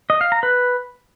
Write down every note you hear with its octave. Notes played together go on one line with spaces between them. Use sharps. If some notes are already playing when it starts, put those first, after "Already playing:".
D#5
F5
A#5
B4